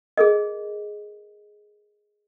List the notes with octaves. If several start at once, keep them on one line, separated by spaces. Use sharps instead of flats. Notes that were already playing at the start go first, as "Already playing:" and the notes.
G#4 A#4 D#5